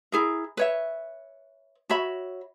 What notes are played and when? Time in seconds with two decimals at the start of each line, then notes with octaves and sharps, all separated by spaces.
0.12 E4 G#4 A#4
0.57 B4 C#5 E5
1.89 F#4 C#5 E5 B5